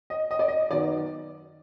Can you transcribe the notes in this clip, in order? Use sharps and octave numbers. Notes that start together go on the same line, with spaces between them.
D#5
D#5
D5
D#5
F#2 D#3 F#3 B3 D5